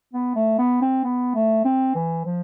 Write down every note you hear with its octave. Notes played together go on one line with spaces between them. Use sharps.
B3
A3
B3
C4
B3
A3
C4
E3
F3